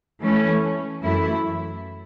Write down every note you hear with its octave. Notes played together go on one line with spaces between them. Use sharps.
E3 A3 C#4
F#2 E3 A3 E4